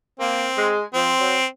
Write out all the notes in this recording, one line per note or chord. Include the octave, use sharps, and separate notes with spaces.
A#3 C4
G#3
F3 C4
F#3